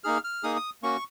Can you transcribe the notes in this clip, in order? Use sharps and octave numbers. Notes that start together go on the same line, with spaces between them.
A#3 D#4 G#4 F6
F6
A#3 D#4 G#4 D#6
D#6
A#3 C#4 F#4 C#6